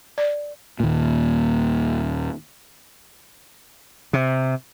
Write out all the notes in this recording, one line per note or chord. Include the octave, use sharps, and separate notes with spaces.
D5
D#2 A#2
C3